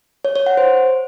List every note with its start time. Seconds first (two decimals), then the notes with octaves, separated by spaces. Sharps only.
0.25 C#5
0.36 C#5
0.46 F#5
0.57 C5